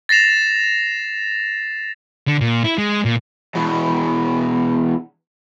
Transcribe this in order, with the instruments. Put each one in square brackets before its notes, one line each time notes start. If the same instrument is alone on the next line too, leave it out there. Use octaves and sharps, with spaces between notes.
[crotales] A6 A#6 C7 E7 F7
[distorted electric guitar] D3
A#2
E4
G#3
A#2
[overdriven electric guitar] E2 B2